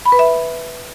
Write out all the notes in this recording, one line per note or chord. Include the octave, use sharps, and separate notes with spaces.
B5
B4
E5